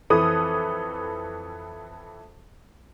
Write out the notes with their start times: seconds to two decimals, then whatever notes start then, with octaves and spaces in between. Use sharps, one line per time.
0.10 F2 E3 A4 B4 D#6